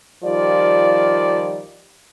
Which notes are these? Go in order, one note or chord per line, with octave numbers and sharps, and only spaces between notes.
D#3 F3 G3 F4 D5